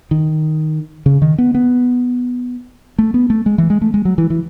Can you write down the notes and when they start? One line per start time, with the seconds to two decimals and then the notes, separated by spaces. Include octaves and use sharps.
0.11 D#3
1.06 C#3
1.22 D#3
1.38 B3
1.55 B3
2.99 A3
3.14 B3
3.30 A3
3.46 G#3
3.58 E3
3.70 G#3
3.82 A3
3.94 G#3
4.05 F#3
4.18 E3
4.30 E3